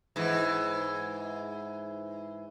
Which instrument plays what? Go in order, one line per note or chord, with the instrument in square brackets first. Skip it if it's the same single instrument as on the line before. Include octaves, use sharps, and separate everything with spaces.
[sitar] G#2 E3